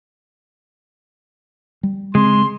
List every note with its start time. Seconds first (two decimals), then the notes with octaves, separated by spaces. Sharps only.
1.83 G3
2.15 C#3 G#3 C4 C6